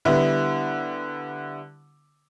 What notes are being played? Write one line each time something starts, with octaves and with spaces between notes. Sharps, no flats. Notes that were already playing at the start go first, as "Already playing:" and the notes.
D3 G3 B3 E4